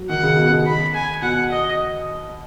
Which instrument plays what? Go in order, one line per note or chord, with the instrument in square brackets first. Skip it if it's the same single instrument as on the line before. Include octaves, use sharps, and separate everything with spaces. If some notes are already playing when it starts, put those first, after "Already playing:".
Already playing: [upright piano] F#3
[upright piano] D#3 [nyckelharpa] F#5
[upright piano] C#3
B2
C#3
[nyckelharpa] B5
G#5
[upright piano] B2 [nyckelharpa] F#5
[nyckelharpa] D#5